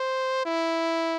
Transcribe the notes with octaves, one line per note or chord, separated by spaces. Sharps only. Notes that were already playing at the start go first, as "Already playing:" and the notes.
Already playing: C5
E4